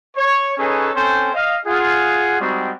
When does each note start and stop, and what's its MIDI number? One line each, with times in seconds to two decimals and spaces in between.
0.16 0.52 73
0.58 0.89 61
0.58 0.89 63
0.58 0.89 68
0.58 0.89 69
0.58 0.89 71
0.58 0.89 73
0.95 1.31 60
0.95 1.31 61
0.95 1.31 69
0.95 1.31 72
0.95 1.31 79
0.95 1.31 80
1.33 1.57 75
1.33 1.57 77
1.66 2.36 65
1.66 2.36 68
1.66 2.36 78
2.40 2.71 55
2.40 2.71 56
2.40 2.71 60
2.40 2.71 63
2.40 2.71 66